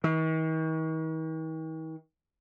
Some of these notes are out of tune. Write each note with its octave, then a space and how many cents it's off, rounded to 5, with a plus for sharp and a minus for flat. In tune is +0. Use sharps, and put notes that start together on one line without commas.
D#3 +45